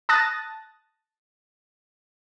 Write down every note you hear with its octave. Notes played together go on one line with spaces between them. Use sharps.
A5 D#6 F#6 A6 A#6